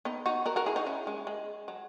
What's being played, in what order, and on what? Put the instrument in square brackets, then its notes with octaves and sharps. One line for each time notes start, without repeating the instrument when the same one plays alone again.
[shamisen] B3 D#4
D#4 F#4
F#4 A#4
F#4 A#4
E4 G#4
D#4 F#4
C#4 E4
G#3
G#3
F#3